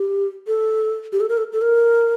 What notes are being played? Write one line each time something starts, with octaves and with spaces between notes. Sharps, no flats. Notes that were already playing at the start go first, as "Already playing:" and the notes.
Already playing: G4
A4
G4
A4
A#4
A4
A4
A#4